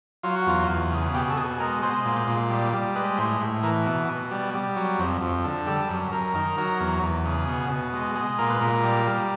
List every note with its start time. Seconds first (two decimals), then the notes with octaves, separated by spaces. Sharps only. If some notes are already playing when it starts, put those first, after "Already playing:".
0.23 F#3 F4
0.36 F#4
0.46 E2 F4
0.69 E2
0.91 C#3
1.14 B2 G4
1.30 A4
1.37 B2 G#4
1.60 G#3 A#4
1.82 G#3 C5
2.05 A#2
2.27 A#2
2.50 G3
2.73 G3
2.95 G#3 B4
3.18 A2 C5
3.41 A2
3.63 E3 A#4
3.86 B2
4.08 B2
4.31 G3
4.54 G3
4.76 F#3
4.99 F2
5.21 F2
5.44 D3
5.67 G3 A4
5.89 F#2
6.12 F#2 A#4
6.35 D#3
6.57 F#3
6.80 E2
7.03 E2
7.26 C#3
7.48 B2
7.70 B2
7.93 G#3
8.16 G#3
8.38 A#2 A#4
8.49 B4
8.60 A#2 A#4
8.84 G3
9.06 G3